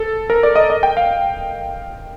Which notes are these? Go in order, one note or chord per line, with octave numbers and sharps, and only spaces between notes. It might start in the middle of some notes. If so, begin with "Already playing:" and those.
Already playing: A4
A#4
D5
D#5
D#5
G5
F5